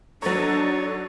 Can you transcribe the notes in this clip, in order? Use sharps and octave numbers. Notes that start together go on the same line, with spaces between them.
F#3 D4 D#4 A4 C#5 A#5